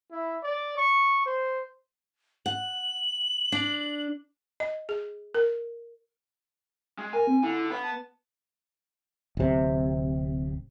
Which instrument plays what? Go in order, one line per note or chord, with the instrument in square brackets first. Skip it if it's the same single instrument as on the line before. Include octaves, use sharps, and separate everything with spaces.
[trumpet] E4
D5
C#6
C5
[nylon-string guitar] F#5 [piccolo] F#7
[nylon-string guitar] D4
[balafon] D#5
G#4
A#4
[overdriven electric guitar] G#3
[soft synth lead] A#4 [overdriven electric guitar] G#5
[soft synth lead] C4
[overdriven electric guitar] D3 [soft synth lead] E4
[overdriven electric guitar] B3 [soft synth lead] B5
[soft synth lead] A5
[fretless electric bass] D1 C3